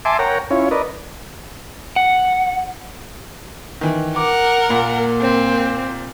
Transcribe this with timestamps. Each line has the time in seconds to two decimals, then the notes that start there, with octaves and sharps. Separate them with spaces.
0.05 E5 G#5 A5 C6 D6
0.19 A#4 C#5 F#5 G5 A#5
0.51 C#4 E4 F4 C#5
0.71 A#4 B4 D5 D#5
1.96 F#5
3.81 D#3 E3
4.16 A#4 F#5 D6
4.70 A#2 A#3
5.21 C4